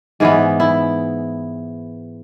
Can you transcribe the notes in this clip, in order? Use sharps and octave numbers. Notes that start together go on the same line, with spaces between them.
G#2 E3 B3 G#4
E4